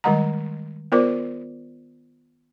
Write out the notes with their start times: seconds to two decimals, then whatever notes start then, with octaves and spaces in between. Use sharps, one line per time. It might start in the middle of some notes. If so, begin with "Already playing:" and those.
0.04 D#3 G3 G#3 D#5 F#5 A#5
0.92 B3 F4 A#4 C5 D5 D6